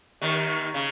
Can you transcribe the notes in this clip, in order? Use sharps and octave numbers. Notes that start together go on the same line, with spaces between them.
D#2 D#3
C#3